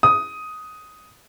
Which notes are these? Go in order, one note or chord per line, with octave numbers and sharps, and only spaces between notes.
D#6